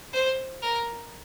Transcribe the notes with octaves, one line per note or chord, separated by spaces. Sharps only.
C5
A#4